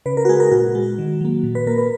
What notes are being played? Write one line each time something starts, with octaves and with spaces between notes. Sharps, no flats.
C#3 B4
A#4
F#4
G#3 G#4
A#4
A#2 F#4
G#3
D#3
F#3 A#3
A#2
B4
A#3 A#4
B4